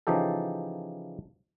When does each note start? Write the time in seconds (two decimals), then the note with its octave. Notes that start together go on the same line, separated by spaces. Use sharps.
0.07 C#3 E3 F3 D#4 G4 A4